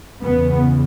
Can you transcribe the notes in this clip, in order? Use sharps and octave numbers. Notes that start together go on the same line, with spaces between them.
E2 C#3 B3